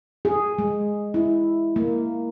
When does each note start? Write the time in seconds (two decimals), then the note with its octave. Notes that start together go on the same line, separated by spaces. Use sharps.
0.25 G#4
0.58 G#3
1.14 E4
1.76 A#3